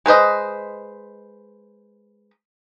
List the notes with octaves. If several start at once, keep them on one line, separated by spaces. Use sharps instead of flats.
G#3 B4 C5 D#5